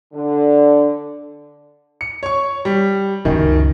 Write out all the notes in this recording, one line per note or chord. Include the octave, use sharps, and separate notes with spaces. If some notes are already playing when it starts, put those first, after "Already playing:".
D3
C#7
C#5 C#6
G3
C#2 F#2 D#3